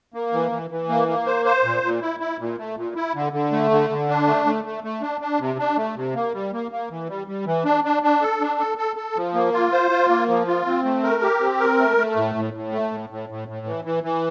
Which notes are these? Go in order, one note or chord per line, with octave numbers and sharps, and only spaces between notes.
A#3
E3
E3
E3
A#3
A#3
C5
C5
A#2
A#2
E4
E4
A#2
A3
A#2
E4
D3
D3
A3
D3
D3
D4
A3
A3
A3
A3
D4
D4
C3
D4
A3
C3
A#3
G3
A#3
A#3
E3
G3
G3
E3
D4
D4
D4
A4
D4
A4
A4
A4
F3
A#3
F4
C5
F4
A#3
F3
F4
C4
A3
A#4
G4
C4
A#4
A3
A3
A2
A2
A2
A3
A2
A2
A2
A2
E3
E3
E3